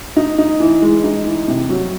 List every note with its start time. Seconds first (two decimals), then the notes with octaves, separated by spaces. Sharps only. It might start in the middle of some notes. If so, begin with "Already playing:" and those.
0.16 D#4
0.38 D#4
0.60 E3
0.82 G#3
1.04 D#4
1.26 E3
1.48 C3
1.70 F#3